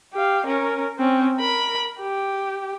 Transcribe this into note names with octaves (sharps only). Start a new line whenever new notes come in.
G4 F5
C#4 A#4
C4 C#4
A#4 B5
G4